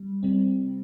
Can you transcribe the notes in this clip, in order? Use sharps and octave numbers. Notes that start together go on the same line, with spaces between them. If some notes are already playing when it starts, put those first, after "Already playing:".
Already playing: G3
C3 G3 C4